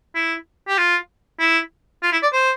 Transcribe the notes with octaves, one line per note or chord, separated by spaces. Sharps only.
E4
G4
F4
E4
F4
E4
D5
C5